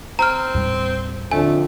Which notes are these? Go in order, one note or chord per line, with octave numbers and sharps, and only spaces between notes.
C4 A#5 F6
D#2 A2 G3
F2 D3 A3 G#5